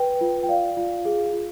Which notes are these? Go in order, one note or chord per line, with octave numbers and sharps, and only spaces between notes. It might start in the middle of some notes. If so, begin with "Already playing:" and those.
Already playing: B4 G5
F4
G5
D5 F5
F4
G#4
F4